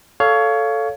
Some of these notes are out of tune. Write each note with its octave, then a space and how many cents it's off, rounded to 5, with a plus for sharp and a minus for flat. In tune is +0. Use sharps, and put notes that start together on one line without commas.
A4 +0 C#5 +20 F5 +0